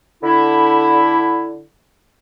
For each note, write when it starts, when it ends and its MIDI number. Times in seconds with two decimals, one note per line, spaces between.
0.23 1.63 50
0.23 1.63 64